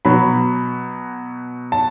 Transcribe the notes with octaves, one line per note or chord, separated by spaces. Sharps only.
B2 F#3 B3 B5
A5